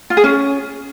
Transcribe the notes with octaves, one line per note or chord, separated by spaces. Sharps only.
F4
G#4
C#4